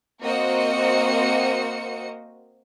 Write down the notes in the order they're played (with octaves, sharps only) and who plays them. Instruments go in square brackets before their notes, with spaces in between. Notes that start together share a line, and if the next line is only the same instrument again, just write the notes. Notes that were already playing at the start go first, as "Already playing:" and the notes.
[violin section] A#3 C4 F#4 C5 D#5 C#7